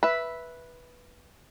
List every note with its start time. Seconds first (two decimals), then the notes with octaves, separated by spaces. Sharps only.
0.03 B4 E5